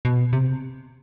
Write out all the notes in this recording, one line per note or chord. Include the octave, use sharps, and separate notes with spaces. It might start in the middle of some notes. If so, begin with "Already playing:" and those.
B2
C3